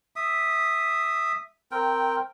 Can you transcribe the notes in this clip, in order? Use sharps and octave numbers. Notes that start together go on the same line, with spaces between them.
E5 D#6
C4 A#4 G5